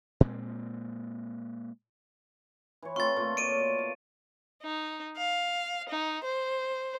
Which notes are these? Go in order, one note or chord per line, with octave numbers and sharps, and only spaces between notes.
A#2 G#3 C4
E3 C#5
A3 C4 F4 C#6 A6
A#2 A3 F4
C#5 D5 D7 D#7
B2
F5
D#4
F5
D#4
C5